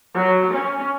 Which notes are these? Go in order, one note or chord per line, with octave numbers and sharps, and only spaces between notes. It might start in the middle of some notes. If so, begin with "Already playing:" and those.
F#3
C#4